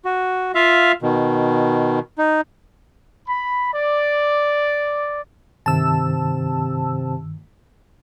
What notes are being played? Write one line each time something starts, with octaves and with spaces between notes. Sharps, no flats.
F#4
F4 E5 F5
B2 D#3
D#4
B5
D5
G2 C3 D#3 A5 E6